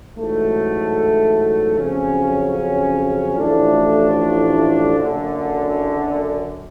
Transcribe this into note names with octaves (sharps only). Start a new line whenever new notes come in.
A1 G#2 F#3 A3
F2 C#3 F#3 C#4
A1 A2 F3 A3 D4
F#1 F#2 D3